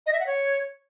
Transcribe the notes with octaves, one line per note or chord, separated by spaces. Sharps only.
D#5
E5
F#5
C#5